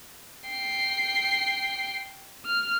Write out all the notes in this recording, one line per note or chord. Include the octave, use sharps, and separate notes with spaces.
G5 C7
F6